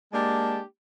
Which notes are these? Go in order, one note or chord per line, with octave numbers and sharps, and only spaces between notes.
G#3 A#3 D4 G4 A5